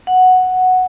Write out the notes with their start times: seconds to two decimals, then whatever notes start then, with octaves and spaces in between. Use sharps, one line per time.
0.07 F#5